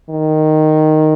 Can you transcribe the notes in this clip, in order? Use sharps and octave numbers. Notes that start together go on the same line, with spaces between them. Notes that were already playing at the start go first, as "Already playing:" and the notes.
D#3